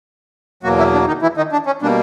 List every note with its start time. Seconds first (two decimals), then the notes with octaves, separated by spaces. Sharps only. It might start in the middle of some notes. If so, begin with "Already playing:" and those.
0.63 E2 B2 F#3 A#3 F#4
0.78 E3 E4
0.93 D4
1.07 D#3 D#4
1.22 E3 E4
1.37 D#3 D#4
1.52 D4
1.66 C#4
1.82 B2 G3 A#3 D4